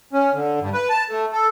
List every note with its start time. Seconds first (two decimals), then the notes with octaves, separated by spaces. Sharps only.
0.13 C#4
0.33 D3
0.61 G2
0.73 B4
0.90 A5
1.08 A3
1.32 A4